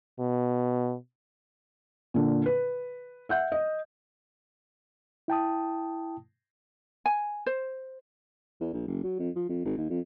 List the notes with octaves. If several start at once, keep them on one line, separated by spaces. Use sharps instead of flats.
B2
A#2 D3
B4
E5 F#5 G6
D#5
E4 G5 A5 D#6
G#5
C5
E2
A#1
F#1
F#3
F2
F3
F2
G#1
D#2
F2